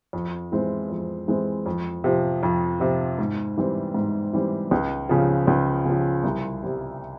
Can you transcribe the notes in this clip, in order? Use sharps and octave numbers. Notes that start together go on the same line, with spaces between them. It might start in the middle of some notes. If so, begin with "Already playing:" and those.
F2
E3 G#3 C4 E4
F2
E3 G#3 C4 E4
F2
C3 F3
F2
C3 F3
G#2
E3 G3 C4
G#2
E3 G3 C4
C#2
C#3 F3
C#2
C#3 F3
C2
C3 G3